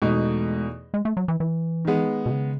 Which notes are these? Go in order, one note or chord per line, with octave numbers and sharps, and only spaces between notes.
E2 B2 G#3 A3 D#4
G#3
A3
F#3
E3
E3
D#3 G#3 B3
B2
C#3